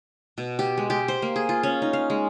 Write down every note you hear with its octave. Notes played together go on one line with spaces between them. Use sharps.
B2
G4
G#3
G4
C5
A#3
G#4
F4
C#4
D#4
F5
G#3